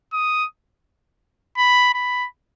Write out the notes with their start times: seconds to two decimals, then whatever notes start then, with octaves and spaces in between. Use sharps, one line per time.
0.13 D#6
1.57 B5
1.94 B5